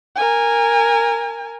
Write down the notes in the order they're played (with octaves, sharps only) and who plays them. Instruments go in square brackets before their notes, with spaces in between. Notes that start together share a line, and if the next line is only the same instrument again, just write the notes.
[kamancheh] A#4 G#5